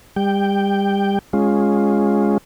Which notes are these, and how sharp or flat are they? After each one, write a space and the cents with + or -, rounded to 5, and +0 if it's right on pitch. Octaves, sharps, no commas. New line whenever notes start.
G3 +30 G5 +0
G#3 +0 C#4 +0 F4 +10